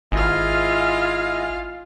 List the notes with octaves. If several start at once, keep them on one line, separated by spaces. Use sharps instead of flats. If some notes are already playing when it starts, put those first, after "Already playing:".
G#1 E4 F4 D#5 F5 G#5